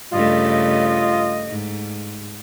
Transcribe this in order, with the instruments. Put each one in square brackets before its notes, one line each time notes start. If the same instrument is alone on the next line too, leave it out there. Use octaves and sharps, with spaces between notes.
[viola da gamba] G2 C#3 A3 [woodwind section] F4 D#5
[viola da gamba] G#2